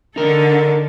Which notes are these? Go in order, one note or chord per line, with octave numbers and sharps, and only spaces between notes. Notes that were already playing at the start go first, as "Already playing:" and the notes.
D3 D#4 A4 A#4